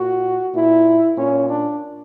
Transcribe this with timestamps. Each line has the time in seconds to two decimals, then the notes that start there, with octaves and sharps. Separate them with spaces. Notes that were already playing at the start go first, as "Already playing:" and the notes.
Already playing: A#2 F#4
0.54 A#2 E4
1.18 A#2 C#4
1.49 D4